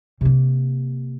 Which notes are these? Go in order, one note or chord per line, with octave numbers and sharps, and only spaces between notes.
C3 A#3